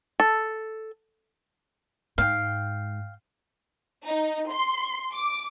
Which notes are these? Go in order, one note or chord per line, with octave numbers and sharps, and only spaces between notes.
A4
G#2 F5 G5
D#4
C6
D6